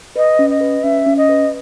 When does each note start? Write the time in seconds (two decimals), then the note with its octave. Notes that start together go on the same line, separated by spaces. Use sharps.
0.16 B4 D#5
0.39 C#4
0.50 D#5
0.61 B4
0.83 C#4 E5
1.06 C#4
1.17 D#5
1.29 B4